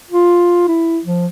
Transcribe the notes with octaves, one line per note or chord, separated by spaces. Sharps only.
F4
E4
F3